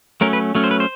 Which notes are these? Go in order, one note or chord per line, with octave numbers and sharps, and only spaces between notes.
F#3 A3 C#4 A#4
B4
F#3 A3 C#4
C5
B4
C5